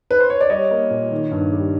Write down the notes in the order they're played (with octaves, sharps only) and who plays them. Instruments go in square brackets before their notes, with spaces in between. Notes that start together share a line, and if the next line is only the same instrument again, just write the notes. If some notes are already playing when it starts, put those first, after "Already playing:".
[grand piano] B4
C5
C#5
D5
G3 C#5 D#5
A#3
A#2
D#3
G2
G3